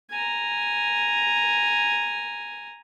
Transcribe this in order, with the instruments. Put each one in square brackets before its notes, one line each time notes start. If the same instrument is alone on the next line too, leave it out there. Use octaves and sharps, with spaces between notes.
[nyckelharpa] G#5 A#5